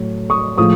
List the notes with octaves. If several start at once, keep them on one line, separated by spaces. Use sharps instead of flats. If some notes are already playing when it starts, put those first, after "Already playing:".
Already playing: A2 F#3
C#6 D#6
A2 F3 G#3 C#6 D#6